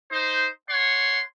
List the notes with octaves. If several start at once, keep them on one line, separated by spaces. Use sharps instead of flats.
D#4 C5
C#5 F#5 C6